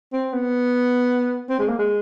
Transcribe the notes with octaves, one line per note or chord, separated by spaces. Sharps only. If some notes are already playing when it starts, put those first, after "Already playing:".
C4
B3
C4
G#3
A#3
G#3